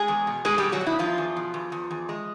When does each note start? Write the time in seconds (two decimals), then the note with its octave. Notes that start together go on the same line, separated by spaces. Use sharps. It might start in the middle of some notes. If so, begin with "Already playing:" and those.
Already playing: G#3 G#4
0.08 E2
0.27 B2
0.45 B2 G#3 G#4
0.58 B2 G3 G4
0.72 F#3 F#4
0.81 B2
0.86 E4
0.99 E2 F3 F4
1.18 E2
1.37 B2
1.54 E2
1.72 E2
1.91 E2
2.09 G#3